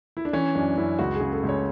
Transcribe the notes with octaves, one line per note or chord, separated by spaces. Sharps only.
E4
D4
E3 C#4
F#2 D4
F#2 E4
C#2 F#4
G#4
C#3
A4
C#2
C#5